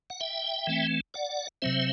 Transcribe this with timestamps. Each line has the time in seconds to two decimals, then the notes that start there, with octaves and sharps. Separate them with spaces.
0.10 F#5
0.20 E5 G5
0.67 E3 A3 C4
1.14 D5 F#5
1.62 C3 F#3 C4 C5 E5